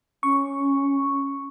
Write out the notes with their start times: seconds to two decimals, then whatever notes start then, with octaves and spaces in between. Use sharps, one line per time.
0.23 C#4 C#6